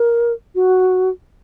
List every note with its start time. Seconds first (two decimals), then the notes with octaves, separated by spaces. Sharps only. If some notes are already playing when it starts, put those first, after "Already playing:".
Already playing: A#4
0.55 F#4